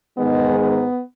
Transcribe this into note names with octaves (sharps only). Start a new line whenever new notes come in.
G#2 D#3 G#3 B3
B3